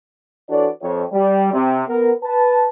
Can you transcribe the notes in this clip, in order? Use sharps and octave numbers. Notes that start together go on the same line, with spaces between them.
E3 D4 F#4 A4 C#5 D5
F2 C#5
G3
C3
B3 A#4
B4 A5